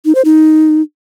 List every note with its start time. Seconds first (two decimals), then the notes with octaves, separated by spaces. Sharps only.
0.05 D#4
0.15 C5
0.25 D#4